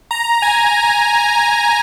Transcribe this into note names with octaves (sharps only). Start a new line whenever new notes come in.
A#5
G#5